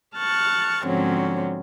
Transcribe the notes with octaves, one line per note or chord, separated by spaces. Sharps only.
A5 C#6 F6 F#6 A6
G#2 D3 F3 F#3 C4 C#4